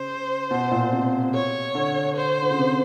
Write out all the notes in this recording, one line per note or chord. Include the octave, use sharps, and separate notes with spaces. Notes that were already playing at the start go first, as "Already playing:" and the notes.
Already playing: C#3 C5
B2
A#2
C3
C#5
D3
C5
D3
C#3
C3